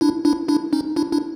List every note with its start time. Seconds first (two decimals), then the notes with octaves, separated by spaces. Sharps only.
0.01 D4 E4
0.25 D4 E4
0.48 D4 E4
0.73 C#4 D#4
0.96 D4 E4
1.12 D4 E4